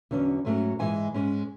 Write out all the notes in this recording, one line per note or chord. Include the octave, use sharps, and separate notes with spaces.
E2 D3 F#3 C#4
G#2 F#3 A3 C#4
G#2 E3 G#3 G#5
G#2 G#3 C#4